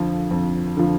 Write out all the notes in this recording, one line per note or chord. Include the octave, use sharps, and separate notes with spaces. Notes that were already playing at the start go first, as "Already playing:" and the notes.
Already playing: F2 D3 F3
F2
D3 F3